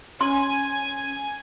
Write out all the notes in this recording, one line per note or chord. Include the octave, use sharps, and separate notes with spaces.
C#4 G#5 C6